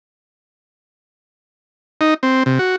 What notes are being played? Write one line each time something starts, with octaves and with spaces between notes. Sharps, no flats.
D#4
C4
C3
F#4